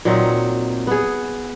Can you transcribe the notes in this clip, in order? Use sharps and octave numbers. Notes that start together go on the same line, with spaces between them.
A#2 F#3 C4 D#4
B3 G#4